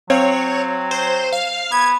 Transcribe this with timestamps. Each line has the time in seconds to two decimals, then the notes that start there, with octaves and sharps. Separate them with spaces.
0.10 F#3 C4 C#5 F5
0.91 C5
1.33 F5
1.72 B3 G#6